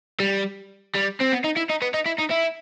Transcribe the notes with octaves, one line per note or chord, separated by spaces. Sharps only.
G3
G3
C4
B3
D#4
E4
D#4
B3
D#4
E4
D#4
E4